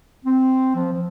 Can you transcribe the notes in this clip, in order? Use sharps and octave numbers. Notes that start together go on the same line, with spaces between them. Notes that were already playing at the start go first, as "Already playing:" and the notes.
C4
F3
F3